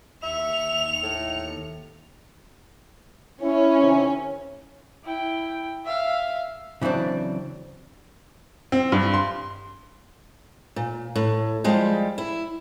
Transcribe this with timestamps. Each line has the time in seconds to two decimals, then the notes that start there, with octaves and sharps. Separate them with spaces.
0.23 D#2 E5 C#7 F7
1.03 A2
3.42 C#4 E4
3.80 C3 D#3 E4
5.05 E4 G5
5.85 E5 F5
6.82 C#3 E3 F#3 C4 D4
8.72 C4
8.92 G2
9.14 C6
10.76 A#2
11.16 A2
11.64 F3 G3 G#3 G4
12.18 E4